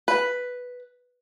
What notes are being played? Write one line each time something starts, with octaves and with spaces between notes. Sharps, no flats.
B4